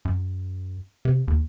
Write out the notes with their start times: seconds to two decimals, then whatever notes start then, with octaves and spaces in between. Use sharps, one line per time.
0.05 F#2
1.05 C3
1.28 D#2